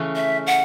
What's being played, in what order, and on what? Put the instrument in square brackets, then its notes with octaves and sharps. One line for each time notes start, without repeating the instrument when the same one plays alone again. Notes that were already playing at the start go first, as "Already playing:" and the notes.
Already playing: [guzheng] C#3 E3 A3 C#4
[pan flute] E5
F#5